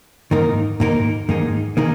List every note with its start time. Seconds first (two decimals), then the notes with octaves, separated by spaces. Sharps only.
0.31 G#2 D#3 A#3 D#4 A#4
0.80 G#2 D#3 A#3 D#4 A#4
1.29 G#2 D#3 A#3 D#4 G#4
1.77 D#3 A#3 D#4 G#4